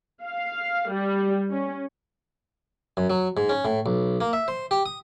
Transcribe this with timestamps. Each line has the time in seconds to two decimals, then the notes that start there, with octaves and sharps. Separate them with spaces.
0.24 F5
0.91 G3
1.51 C#4
2.97 F#2
3.10 F#3
3.37 G#2
3.49 C#4
3.65 A2
3.86 B1
4.21 A#3
4.33 E5
4.48 C5
4.71 G4
4.86 D#6